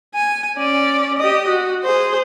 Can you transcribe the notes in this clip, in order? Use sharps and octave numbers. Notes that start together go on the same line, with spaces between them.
G#5
C#4 D5
G4 D#5
F#4
G#4 C5